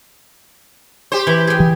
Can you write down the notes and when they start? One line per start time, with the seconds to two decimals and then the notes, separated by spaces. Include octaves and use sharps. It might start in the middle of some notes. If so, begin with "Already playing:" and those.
1.12 G4 C5
1.27 E3 E4
1.47 G#4 G5
1.60 E3